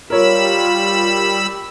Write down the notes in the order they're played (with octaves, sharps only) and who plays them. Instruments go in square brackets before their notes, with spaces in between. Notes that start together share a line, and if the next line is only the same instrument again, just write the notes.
[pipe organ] G3 B5 E6 [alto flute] F4 [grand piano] A#4 C#5